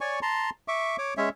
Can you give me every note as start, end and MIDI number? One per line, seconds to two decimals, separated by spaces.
0.01 0.20 73
0.01 0.20 74
0.01 0.20 80
0.01 0.20 85
0.22 0.50 81
0.22 0.50 82
0.22 0.50 84
0.68 0.96 76
0.68 0.96 85
0.68 0.96 86
0.98 1.14 73
0.98 1.14 86
1.17 1.29 56
1.17 1.29 61
1.17 1.29 73
1.17 1.29 76